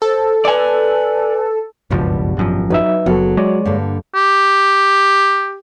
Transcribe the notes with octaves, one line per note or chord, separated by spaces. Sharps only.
A4 C5
B4 D5 G#5
F#1 C#2 G2 B2 F3 G3
G#1 F#2 F3
F#3 D#4 B4 E5
F#1 F#3 B3 A4
G#3 C#5 D5
G2 D3 A#3
G4